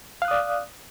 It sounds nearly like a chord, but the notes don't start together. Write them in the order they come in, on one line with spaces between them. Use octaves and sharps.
F5 F#6 D#6 D5